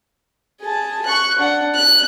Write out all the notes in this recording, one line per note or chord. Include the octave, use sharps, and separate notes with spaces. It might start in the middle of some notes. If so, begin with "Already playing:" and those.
G#4 A5
C#6 F#6
D4 F#5
F#6